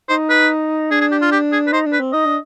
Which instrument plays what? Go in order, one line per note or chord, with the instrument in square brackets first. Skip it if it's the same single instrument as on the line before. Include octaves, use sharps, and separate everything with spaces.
[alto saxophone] D#4 [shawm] C5
[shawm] B4
[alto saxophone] D4 [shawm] G#4
[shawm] G#4
G4
F4
G4
G#4
B4
[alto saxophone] D#4 [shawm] C5
[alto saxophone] D4
[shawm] B4
[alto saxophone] C4
[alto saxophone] D#4 [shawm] D#5
[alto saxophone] D4